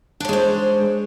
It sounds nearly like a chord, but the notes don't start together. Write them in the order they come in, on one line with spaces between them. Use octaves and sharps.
D4 C#5 G#3 C5